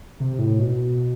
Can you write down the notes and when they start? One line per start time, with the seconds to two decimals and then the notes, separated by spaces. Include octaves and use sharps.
0.20 C3
0.39 A2
0.59 B2